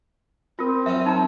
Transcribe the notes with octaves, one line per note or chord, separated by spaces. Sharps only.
C4 F4 A#4
F#2 C#4 E5
D#4 A#5